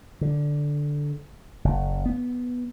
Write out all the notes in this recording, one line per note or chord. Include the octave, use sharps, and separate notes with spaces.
D3
F#1
B3